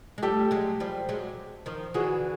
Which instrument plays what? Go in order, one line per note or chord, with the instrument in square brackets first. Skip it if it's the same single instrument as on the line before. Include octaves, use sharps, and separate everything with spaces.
[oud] G#3
[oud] G3 A3 [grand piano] G4 A4
[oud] F#3 G#3
F3 G3
F#3 G#3
D#3 F3
[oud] D3 E3 [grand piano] F#4 G#4